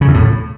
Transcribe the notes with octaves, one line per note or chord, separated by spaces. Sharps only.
C#3
E2
A2